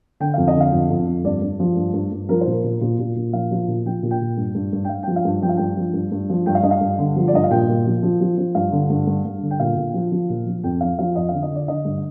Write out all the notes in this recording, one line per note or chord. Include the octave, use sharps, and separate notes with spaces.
D3 G5
F2 F5
D#5
D3
F5
F2
F2
F2
G2 D5
G2
F3
G2
G2
G2
F3 A#4
C5
A#2
A#4
A#2
A#2
A#2
A#2
F3 F5
F3
A#2
F3 G5
A#2
G5
A#2
G2
G2
G2
G5
G2 F5
F3 G5
F5
G2
F3 G5
F5
G2 G5
F3
G2
G2
F3
G2 G5
F5
G2 D#5
F5
G2
D3
F3
D5
G2 D#5
F5
A#2 G5
A#2
F3
F3
F3
F3
G2 F5
D3
G2
G2
G2
D3
G5
A#2 F5
A#2
F3
F3
A#2
F3
F2 G5
F3 F5
F3 F5
F2 D#5
D3 F5
D#5
D3 D5
D3 D#5
G2